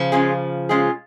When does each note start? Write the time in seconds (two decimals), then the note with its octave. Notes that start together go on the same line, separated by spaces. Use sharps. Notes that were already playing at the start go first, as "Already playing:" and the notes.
Already playing: C#3 F3
0.12 G#3 C#4 F4 G#4
0.69 G#3 C#4 F4 G#4